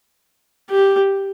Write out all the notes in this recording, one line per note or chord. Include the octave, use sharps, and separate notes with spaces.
G4